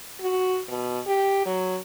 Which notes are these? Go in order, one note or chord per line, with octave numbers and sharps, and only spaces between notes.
F#4
B2
G4
F#3